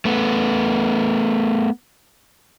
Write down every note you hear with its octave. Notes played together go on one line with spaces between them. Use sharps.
A3 B3